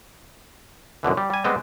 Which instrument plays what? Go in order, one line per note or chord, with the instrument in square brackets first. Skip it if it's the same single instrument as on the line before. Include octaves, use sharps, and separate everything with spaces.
[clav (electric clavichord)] F#2 B2 D3 E3
G3
G3 G#5
G3 G#3 B3 C4 D#5